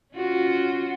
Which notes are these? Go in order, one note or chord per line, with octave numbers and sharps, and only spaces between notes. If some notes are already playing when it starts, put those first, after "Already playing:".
C#4 F4 F#4